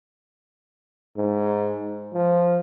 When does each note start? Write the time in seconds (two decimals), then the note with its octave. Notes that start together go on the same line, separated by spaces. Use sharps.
1.17 G#2
2.14 F3